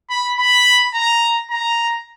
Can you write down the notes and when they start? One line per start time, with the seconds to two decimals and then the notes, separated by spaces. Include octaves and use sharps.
0.10 B5
0.38 B5
0.95 A#5
1.51 A#5